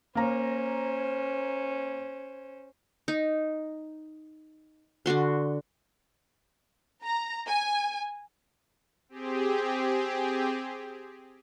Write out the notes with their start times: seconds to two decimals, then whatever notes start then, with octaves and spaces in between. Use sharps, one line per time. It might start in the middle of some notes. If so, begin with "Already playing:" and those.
0.15 A#3 C#4 C5 F5 A#5
3.08 D#4
5.06 D3 D4 F#4 C6
7.03 A#5
7.47 G#5
9.09 C4 G4 G#4